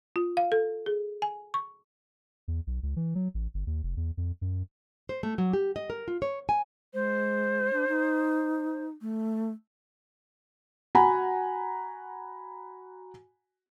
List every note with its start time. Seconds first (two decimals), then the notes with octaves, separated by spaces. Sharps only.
0.16 F4
0.37 F5
0.52 A4
0.86 G#4
1.22 G#5
1.54 C#6
2.48 E2
2.67 B1
2.83 C#2
2.96 E3
3.15 F#3
3.34 A1
3.54 G1
3.67 D#2
3.83 F1
3.97 E2
4.17 F2
4.41 F#2
5.09 C5
5.23 A3
5.38 F#3
5.53 G4
5.76 D#5
5.90 A#4
6.08 F4
6.22 C#5
6.49 G#5
6.94 G#3 C5
7.73 D4
7.88 D#4
9.01 A3
10.95 F#4 F#5 G#5 A#5 B5